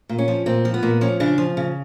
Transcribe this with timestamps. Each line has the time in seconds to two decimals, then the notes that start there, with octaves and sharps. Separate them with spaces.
0.09 A#2
0.18 C#4
0.28 F3
0.46 A#2 C4
0.65 F3
0.74 B3
0.83 A#2
1.01 F3 C#4
1.20 C#3 D4
1.38 F3
1.57 C#3